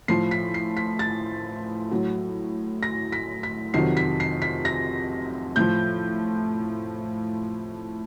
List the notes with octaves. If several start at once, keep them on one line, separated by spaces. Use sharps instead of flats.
A2 F3 C7
B6
C7
B6
A6
A2 F#3
A#6
B6
B6
F2 C3 D#3 F#3 C7
B6
C7
B6
A#6
A2 F3 G6